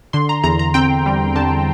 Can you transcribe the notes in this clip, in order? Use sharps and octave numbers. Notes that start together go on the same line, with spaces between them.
D3 C6
A#5
E2 A#5
A#5
C4 G5
G3
D3 A5